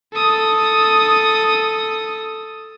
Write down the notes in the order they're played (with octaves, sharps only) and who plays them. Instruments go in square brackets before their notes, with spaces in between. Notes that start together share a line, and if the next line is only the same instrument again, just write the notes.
[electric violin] A4 D#6